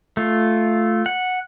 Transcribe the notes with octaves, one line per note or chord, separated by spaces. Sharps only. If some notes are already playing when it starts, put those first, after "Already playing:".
A3 F4
F#5